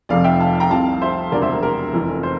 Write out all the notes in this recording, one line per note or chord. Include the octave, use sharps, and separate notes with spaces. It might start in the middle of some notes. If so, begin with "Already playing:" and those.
F1 F2 C3 F3 D5 F5
E5 G5
F5 A5
G5 A#5
C2 C3 F3 F5 A5
C5 E5
E1 D2 C3 G3 A#4 D5
C5 E5
A#4
A#4
F1 F2 E3
C5